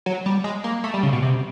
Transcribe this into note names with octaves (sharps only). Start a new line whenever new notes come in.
F#3
G3
G#3
A#3
A3
G3
C#3
B2
C3